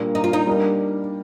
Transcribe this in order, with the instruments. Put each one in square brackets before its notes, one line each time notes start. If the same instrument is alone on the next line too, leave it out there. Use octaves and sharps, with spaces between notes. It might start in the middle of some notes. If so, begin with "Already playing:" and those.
Already playing: [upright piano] A#2 G3 A#3 D4
[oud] D#4
F4
D#4
[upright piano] G3 A#3 D4